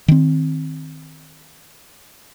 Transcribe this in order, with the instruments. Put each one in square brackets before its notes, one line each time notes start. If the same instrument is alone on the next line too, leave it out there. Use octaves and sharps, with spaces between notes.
[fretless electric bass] D#3 C4